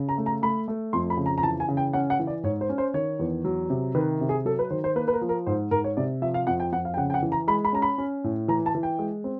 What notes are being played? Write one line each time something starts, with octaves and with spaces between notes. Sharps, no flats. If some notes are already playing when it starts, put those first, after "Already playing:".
Already playing: C#3
A#5
A3
A#5
A3 B5
A3
F2 C6
B5
C#3
A#5
A#5
E3 A5
G#5
C#3
G5
C#4 F#5
F#5
E3
D5
G#2 C#5
C5
C#4
C5
D#3 C#5
E2
F#3
C3
D#3 B4
C3
G#4
F#3 A4
B4
D#3 C5
C5
A#3 B4
B4
A#4
F3
A#4
G#2 C5
G#2 A#4
C#5
C3 D5
F3 E5
F5
F2 F#5
G5
F2 F#5
F5
G5
C#3 F#5
G5
F#5
E3
A#5
G#3 B5
B5
C#4 A#5
B5
C#4
A2
E3 A#5
A5
E3
G5
G#3
C4